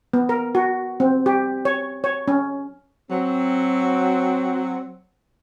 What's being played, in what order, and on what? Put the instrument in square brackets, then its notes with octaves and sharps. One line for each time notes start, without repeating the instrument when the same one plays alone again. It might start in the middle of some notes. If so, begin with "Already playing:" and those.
[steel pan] B3
A#4
F#4
C4
G4
C#5
C#5
C#4
[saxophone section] F#3 C4